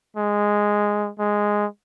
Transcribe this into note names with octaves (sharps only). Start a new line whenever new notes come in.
G#3
G#3